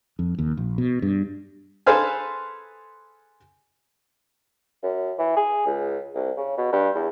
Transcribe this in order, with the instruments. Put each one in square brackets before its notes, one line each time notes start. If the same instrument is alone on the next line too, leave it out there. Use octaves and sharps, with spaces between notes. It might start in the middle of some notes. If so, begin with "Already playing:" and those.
[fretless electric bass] F2
D#2
A#1
B2
G2
[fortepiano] G#4 A4 B4 C5 F5 G#5
[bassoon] F#2
E3
G#4
C#2
C2
C#3
B2
G2
E2